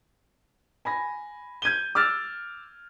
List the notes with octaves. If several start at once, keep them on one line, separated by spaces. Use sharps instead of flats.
G#5 B5 A#6
G6 G#6 D#7 G7
D6 E6 F6 A6